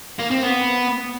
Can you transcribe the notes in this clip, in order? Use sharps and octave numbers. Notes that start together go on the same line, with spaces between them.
A#3
C4
B3